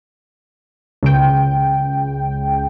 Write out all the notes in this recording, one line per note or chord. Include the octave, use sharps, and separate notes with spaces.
C#2 C#3 G5